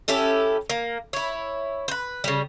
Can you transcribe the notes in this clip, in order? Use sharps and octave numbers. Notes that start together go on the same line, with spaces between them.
C#4 E4 G4 A4
A#3
E4 C#5
B4 C5
C#3 G3